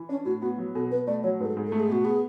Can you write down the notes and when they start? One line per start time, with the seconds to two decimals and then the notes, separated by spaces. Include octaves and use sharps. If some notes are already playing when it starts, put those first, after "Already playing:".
Already playing: E3
0.09 C#4 D4
0.25 A2 F#4
0.42 B3 F#4
0.58 F#3
0.75 B2 A4
0.91 B2 B4
1.07 A3 D5
1.23 F#3 C#5
1.40 G#2 B4
1.45 A4
1.57 G#2
1.67 A3 A4
1.80 G#4
1.89 B2 F#4
2.05 B3 G#4